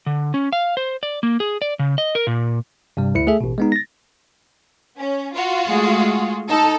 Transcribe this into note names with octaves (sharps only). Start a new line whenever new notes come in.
D3
C#4
F5
C5
D5
A#3
G#4
D5
C#3
D#5
A#4
A#2
G2 C3 G3
D2 E4 C#7
A3 G#4 A4 E5
A1 B2
G#3 B3 D#4
A6 A#6
C#4
F4 F#4
G#3 A3 G#4
D#4 A4